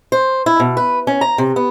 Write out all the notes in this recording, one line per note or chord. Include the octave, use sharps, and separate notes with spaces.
C5
E4
B2
B4
C#4
A#5
C3
B3